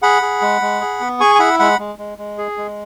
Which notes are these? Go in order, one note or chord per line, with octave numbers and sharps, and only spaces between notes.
G#4 F#5 B5
G#4
G#3
G#3
G#4
B3
G#4 G#5 C#6
G#5
E4 F#5 B5
G#3 F#5 B5
G#3
G#3
G#3
G#4
G#3